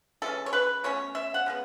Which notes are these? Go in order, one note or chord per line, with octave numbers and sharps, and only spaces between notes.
E3 G#3 C#4 A4
C#5
B4
B2 A3 C#4 C#5
E5
F#5
C#3 G#3 B3